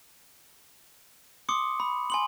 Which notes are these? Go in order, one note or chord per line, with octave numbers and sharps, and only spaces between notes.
C6 D6 D#6 C#7
B5
G#5 C6 F#7